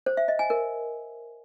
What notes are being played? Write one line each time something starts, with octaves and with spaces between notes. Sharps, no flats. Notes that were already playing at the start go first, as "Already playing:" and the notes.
C5
E5
D#5
G#5
A#4